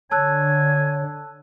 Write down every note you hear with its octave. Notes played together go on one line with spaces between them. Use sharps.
D3 C#5 G#5 A5 E6 F#6